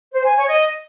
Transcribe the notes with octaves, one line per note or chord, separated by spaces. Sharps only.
C5
G#5
C#5
D#5